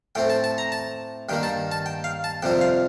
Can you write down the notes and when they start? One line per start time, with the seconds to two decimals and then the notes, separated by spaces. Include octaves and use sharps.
0.15 A2 A3 C4 G5
0.30 A5
0.44 A5
0.58 A#5
0.72 A5
1.29 G2 D#3 A#3 G5
1.43 A5
1.72 A5
1.86 G5
2.04 F5
2.24 A5
2.42 F2 C3 G3 C4 G5
2.61 F5